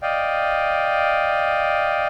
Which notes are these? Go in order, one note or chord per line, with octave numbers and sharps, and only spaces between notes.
D5 D#5 F5 G5